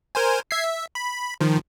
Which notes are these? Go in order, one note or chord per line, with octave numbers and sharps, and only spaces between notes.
A#4 C5 G#5
E5 G#6 C7
E5
B5
D#3 F3